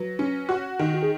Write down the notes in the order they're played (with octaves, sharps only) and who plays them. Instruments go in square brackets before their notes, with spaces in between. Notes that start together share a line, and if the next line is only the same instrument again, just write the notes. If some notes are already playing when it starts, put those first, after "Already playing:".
Already playing: [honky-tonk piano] F#3 [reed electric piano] B4
[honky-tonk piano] C#4
F#4
D#3
[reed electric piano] F#4
G#4